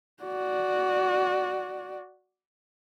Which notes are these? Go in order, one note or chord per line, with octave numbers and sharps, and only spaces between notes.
F#4 D5